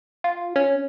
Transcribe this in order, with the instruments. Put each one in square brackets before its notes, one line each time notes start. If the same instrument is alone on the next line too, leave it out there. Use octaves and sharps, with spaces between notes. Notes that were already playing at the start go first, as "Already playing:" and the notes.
[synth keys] F4
C#4